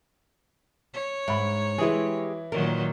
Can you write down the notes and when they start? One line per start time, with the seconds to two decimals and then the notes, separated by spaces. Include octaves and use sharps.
0.94 C#5
1.28 G#2 E5 B5
1.78 E3 G#3 E4 G4 G#4
2.52 A#2 D#3 F#3 A#4